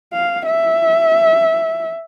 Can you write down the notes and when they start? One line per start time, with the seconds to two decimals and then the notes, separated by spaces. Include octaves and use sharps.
0.13 F5
0.46 E5